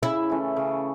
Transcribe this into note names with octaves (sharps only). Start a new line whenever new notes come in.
C#3 E4
E3 A3 C#4
C#3